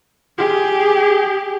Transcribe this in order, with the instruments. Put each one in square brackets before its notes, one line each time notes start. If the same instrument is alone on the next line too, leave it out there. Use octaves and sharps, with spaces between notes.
[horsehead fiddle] G4 G#4